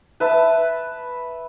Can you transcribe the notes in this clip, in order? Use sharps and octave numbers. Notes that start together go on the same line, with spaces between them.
B4 E5 A5